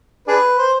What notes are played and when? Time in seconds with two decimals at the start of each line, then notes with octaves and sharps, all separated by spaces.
0.28 D4 G#4 B4
0.58 C5